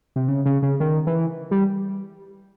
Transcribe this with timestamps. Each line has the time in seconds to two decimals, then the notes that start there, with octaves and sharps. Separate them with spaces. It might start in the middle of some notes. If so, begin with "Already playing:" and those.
0.16 C3
0.28 C#3
0.46 C#3
0.62 C#3
0.80 D#3
1.07 E3
1.51 G3